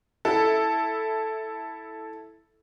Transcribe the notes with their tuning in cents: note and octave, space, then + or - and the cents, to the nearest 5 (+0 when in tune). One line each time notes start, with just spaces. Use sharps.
E4 +0 A4 +0